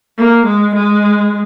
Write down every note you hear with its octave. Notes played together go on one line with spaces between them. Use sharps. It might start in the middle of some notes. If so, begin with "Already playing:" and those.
A#3
G#3
G#3